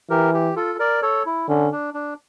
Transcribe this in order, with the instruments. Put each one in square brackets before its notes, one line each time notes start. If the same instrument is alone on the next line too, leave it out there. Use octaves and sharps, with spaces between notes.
[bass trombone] E3 [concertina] G4 A#4
[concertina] G4
F4 A4
A#4 D5
A4 C#5
E4
[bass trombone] D3 [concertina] C#4
[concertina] D4
D4